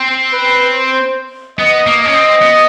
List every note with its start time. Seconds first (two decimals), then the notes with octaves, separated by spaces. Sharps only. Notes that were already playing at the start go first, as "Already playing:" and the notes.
Already playing: C4
0.33 B4
0.75 C5
1.59 B3 D#5
1.87 A#3
2.00 D#5
2.06 C#4
2.14 C4
2.42 B3